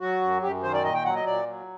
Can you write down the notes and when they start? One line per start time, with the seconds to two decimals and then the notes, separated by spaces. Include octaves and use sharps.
0.01 F#3 F#4
0.21 F#2
0.42 F#2 G4
0.63 D#3 C5
0.74 D5
0.84 A#2 D#5
0.94 G5
1.05 F#3 F#5
1.15 D#5
1.26 A#2 D5
1.46 F#3